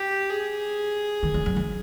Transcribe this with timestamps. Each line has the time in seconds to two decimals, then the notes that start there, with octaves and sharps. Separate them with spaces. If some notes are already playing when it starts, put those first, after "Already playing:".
Already playing: G4
0.30 G#4
1.23 D#3
1.34 E3
1.46 F#3
1.56 E3